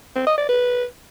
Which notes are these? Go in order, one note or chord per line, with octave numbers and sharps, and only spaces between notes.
C4
D#5
D5
B4